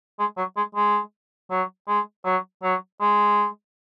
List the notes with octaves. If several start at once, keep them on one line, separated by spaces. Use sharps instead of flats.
G#3
F#3
G#3
G#3
F#3
G#3
F#3
F#3
G#3